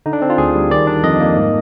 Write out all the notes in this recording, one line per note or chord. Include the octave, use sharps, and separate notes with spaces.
D3 D#4
D4
C4
F4
D2 G#4
G3
D#3 D5
D4
F2 D#5
A#3
G#2